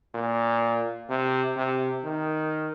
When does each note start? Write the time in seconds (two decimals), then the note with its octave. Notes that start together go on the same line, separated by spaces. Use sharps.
0.14 A#2
1.09 C3
1.57 C3
2.04 D#3